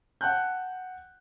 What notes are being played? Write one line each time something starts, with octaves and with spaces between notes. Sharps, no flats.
F#5 G5 A5 F#6 G6